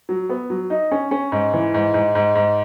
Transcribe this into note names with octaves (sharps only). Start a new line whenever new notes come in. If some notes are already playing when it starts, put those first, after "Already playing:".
F#3
B3
F#3
D#4
C#4
C#4
G#2
E3
G#2
G#2
G#2
G#2